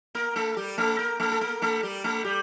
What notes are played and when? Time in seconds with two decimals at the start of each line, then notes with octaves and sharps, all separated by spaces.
0.15 A#3 A#4
0.36 A3 A4
0.57 G3 G4
0.78 A3 A4
0.99 A#3 A#4
1.20 A3 A4
1.32 A4
1.41 A#3 A#4
1.62 A3 A4
1.83 G3 G4
2.04 A3 A4
2.24 G3 G4